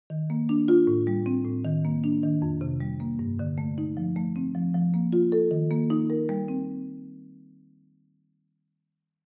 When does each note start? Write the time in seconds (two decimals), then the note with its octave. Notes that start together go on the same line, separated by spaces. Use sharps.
0.10 D#3
0.30 A#3
0.49 D4
0.68 F4
0.87 A2
1.07 G3
1.26 C4
1.45 A2
1.65 D#3
1.85 A#3
2.04 D4
2.23 D#3
2.42 F2
2.61 C3
2.81 G3
3.00 A#3
3.19 G2
3.39 D3
3.58 A3
3.78 D#4
3.97 F3
4.16 A3
4.36 C4
4.55 F3
4.74 F3
4.94 A#3
5.13 F4
5.32 A4
5.51 D#3
5.71 A#3
5.90 D#4
6.10 A#4
6.29 G3
6.48 C4